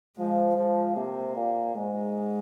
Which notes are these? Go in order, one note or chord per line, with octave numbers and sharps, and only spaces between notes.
F3 G#3
F3 G#3
C3 A#3
A#2
G#2 G#3